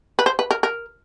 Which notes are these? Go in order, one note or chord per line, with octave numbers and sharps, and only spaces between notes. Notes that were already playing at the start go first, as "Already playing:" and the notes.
B4
C5
B4
A#4
A#4